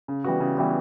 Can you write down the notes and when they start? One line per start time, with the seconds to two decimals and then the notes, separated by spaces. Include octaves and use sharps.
0.08 C#3
0.24 E3 G3 B3 F#4
0.40 C#3
0.57 E3 G3 B3 F#4